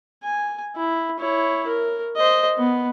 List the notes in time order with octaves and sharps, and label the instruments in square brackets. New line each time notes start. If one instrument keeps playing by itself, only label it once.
[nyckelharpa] G#5
E4
E4 C#5
A#4
C5 D#5
B3